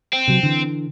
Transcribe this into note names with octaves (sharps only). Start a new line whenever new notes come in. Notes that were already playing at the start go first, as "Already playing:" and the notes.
C4
C3 F#3
D3 E3